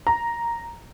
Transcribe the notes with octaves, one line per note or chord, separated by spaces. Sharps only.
A#5